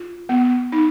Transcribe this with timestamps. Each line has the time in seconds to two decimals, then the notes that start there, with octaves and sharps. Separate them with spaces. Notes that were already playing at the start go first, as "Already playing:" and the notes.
Already playing: F4
0.29 B3
0.72 D#4